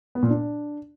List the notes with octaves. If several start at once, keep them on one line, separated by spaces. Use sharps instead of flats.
B3
A#2
D4